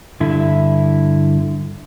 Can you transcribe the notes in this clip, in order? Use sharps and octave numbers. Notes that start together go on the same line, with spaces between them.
G2 D3 E4